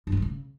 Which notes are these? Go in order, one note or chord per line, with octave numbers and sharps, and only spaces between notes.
G2
G#3
E3
C#3